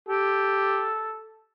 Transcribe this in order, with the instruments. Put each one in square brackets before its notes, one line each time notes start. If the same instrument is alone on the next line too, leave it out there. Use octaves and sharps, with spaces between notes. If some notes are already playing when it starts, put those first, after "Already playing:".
[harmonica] G4 [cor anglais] A4